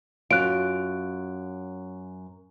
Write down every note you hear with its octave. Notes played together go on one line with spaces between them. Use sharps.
F#2 F4 F#6 D7